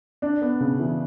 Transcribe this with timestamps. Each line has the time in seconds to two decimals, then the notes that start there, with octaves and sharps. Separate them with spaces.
0.22 D4
0.42 B3
0.60 C#3
0.80 E3